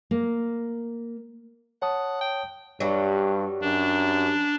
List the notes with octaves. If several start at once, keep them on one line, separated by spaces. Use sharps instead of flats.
A#3
C#5 F#5 A5 D#6
G5
G2 F#3 G3
F#2 D4